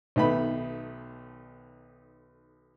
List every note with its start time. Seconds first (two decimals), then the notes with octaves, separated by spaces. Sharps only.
0.16 B1 D#3 A3 B3 B5